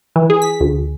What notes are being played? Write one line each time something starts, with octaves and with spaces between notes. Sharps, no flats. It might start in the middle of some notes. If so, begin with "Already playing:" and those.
E3
G#4
B6
D2